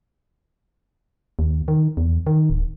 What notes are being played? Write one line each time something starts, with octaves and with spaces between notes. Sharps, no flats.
D#2
D#3
E2
D#3
D1